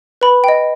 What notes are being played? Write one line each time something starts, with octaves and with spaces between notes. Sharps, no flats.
B4 B5
D#5 G5